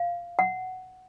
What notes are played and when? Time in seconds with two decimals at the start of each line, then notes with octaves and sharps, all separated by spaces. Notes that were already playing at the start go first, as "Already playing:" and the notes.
Already playing: F5
0.39 F#5